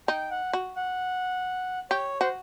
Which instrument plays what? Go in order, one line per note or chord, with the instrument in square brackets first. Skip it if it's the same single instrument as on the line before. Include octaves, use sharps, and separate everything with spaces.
[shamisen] D#4 [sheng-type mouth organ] G5
[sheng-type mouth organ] F#5
[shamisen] F#4
[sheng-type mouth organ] F#5
[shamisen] G4 [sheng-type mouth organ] C#5
[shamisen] F#4 [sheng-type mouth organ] C5